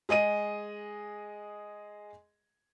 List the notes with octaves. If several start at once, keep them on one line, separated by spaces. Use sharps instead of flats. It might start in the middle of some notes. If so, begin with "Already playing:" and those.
G#3 G#4 D#5 D#7